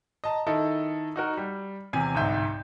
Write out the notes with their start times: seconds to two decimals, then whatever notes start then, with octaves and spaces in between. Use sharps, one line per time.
0.24 D#5 A5 A#5
0.47 D#3 E4 A4 D#5
1.16 D#4 F#4 A#4
1.37 G3
1.93 E2 C3 G#5
2.15 G1 C2 G#2 E5 G6